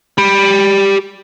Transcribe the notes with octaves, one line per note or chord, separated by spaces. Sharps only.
G4 B5